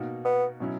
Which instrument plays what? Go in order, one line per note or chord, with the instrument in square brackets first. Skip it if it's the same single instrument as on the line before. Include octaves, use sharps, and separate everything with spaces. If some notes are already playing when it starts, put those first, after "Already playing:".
Already playing: [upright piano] B2 A#3 D#4 F#4
[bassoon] B3
[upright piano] B2 F#3 C#4 E4